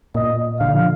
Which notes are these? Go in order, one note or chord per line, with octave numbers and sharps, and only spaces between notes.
A#2 D#5
D3 F5
F3